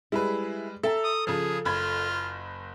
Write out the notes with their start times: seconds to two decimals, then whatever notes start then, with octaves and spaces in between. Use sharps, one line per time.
0.12 G3 G#3 E4 G#4 B4
0.83 A4 E5 G5 A#5 A6
1.04 D#6
1.27 C#3 F3 G#4
1.65 F#1 F4 B5 G#6